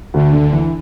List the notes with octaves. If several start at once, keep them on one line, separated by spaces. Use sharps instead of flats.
D2 D3
D2
E3